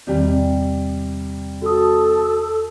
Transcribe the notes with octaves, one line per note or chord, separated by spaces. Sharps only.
E2 C3 D#3 G3
F#4 A4 D#6